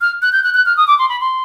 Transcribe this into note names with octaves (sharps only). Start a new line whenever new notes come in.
F6
F#6
G6
F#6
F#6
F6
D#6
D6
C6
B5
C6